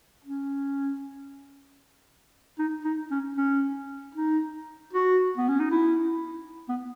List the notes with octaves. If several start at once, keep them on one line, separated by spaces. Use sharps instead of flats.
C#4
D#4
D#4
C#4
C#4
D#4
F#4
B3
C#4
D#4
E4
B3